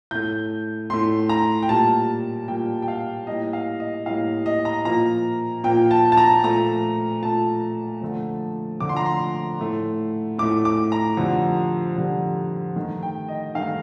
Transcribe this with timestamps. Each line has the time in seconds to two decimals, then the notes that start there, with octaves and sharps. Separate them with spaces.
0.11 A2 A3 G6
0.90 A2 A3 C6
1.29 A#5
1.62 G5
1.69 A#2 G3 A#3 A5
2.48 A#2 G3 A#3 G5
2.82 G5
2.88 F5
3.27 A2 G3 A#3 D#5
3.53 F5
3.80 D#5
4.06 A2 G3 A#3 F5
4.46 D#5
4.65 A#5
4.85 A#2 F3 A#3 A#5
5.64 A#2 F3 A#3 G5
5.91 A5
6.12 A5
6.17 A#5
6.43 A#2 F3 A3 A#5
7.22 A#2 F3 A3 A5
8.02 F2 D3 A3
8.80 F2 D3 A3 D6
8.89 C6
8.96 A#5
9.06 C6
9.60 A2 A3
10.38 A2 A3 D6
10.65 D6
10.92 A#5
11.17 F2 D3 G3
11.97 F2 D3 G3
12.76 G2 D#3 A3
13.03 G5
13.28 D#5
13.55 G2 D#3 A3 F5